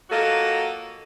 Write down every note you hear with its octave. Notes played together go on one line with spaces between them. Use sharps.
F#3 A#3 F4 F#4 A4 D#5